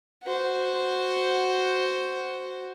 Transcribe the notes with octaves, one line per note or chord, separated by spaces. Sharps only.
F#4 C5